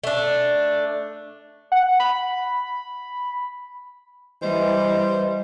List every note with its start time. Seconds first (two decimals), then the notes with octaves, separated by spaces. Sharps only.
0.04 A3 D4
1.72 F#5
2.00 B5
4.42 E3 G3 C5 D#5